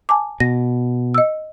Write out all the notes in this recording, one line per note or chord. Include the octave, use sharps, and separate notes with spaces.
G#5 A5 D6
B2 A#6
D#5 E6